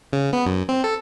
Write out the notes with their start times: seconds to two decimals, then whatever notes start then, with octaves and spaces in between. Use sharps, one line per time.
0.13 C#3
0.33 B3
0.46 F#2
0.69 C4
0.84 A4